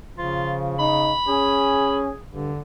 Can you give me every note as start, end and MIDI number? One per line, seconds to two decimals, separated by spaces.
0.17 1.14 49
0.17 0.77 53
0.17 0.56 65
0.79 1.11 63
0.79 1.97 83
1.28 2.10 61
1.28 2.22 68
2.33 2.51 43
2.33 2.61 50